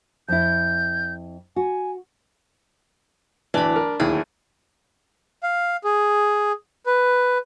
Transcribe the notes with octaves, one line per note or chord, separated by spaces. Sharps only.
F2 E4 G6
F#4 G#5
D1 E3 D4 B5
A#4
D1 D#2 E4 G#4
F5
G#4
B4